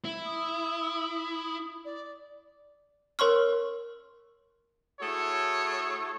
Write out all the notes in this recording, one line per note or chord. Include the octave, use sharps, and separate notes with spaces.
E4
D#6
D5
A#4 C#5 C6 C#6 F6
A3 E4 F#4 G#4 A4 C#5